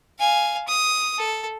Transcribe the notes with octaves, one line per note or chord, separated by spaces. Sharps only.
F5 G#5
D#6
A4